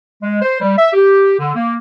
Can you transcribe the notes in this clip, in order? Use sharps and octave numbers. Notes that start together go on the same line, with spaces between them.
G#3
C5
G3
E5
G4
D3
A#3